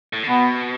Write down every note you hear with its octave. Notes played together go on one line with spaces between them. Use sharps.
A2
D3
B2 B3